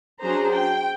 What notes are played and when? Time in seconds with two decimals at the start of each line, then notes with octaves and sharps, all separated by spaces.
0.21 F#3 C#4 D4 G#4 C5 A#5
0.50 G5